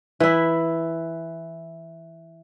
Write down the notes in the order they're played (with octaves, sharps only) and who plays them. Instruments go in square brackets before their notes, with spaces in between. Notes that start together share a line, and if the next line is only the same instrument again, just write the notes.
[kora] E3 E4